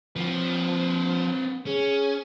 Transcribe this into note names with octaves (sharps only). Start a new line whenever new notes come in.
F3 C4 B4
C#4 G#4